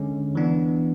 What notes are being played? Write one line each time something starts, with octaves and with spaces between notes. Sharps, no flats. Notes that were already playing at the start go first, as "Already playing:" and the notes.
Already playing: D3 G#3 C#4
E3 B3 D4